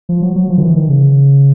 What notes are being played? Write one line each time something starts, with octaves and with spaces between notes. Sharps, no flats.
F3
F#3
F#3
F3
D#3
E3
D#3
C#3